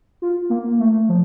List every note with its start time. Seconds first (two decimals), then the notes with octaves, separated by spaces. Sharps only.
0.22 F4
0.50 A#3
0.79 A3
1.09 F3